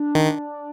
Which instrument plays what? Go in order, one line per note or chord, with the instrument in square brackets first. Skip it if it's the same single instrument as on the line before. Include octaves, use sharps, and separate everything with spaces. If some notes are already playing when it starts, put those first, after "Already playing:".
Already playing: [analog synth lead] D4
[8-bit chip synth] D#3